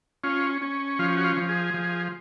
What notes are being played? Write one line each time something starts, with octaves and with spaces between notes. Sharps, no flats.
C#4 F4
C#4
F3 F4
F#4
F4
F3
G#4
F3